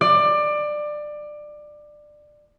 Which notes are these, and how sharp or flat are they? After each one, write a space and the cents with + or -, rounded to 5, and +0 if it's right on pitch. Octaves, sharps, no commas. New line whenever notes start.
D5 +20